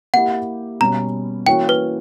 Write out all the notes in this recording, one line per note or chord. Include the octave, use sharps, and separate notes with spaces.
A#3 E4 G4 F#5
B2 G3 C#4 A#5
E3 A#3 C#4 F#4 C#5 G5
B4